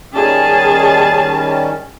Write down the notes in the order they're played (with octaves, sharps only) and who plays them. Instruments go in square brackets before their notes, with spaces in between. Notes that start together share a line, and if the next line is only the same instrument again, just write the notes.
[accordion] D#3 G3 C#4 [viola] G#4 A5